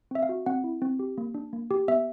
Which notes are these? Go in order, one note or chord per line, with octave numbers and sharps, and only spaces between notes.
C4 E5
F5
F#4
C4 F#5
E4
C4
G4
A#3
D4
A#3
G4
B3 E5